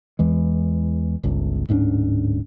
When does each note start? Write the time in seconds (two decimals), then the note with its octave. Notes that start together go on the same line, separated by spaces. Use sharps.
0.19 E2 E3 G#3
1.23 G1 C#2
1.69 D1 G#2 C#4 D4